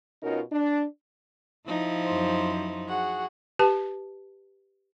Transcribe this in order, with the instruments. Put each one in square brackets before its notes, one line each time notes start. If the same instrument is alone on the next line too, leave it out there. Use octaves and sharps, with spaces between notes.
[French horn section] B2 C#4 D#4 F4 F#4 A#4
D4
[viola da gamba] F3 D#4 E4
[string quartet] F#2 C5
F#4 G#4 F#5
[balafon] G4 B4 A5